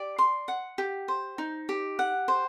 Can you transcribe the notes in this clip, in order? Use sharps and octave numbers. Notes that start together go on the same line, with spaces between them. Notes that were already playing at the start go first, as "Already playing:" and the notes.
Already playing: G4 D5
C6
F#5
G4
C5
D#4
G4
F#5
C5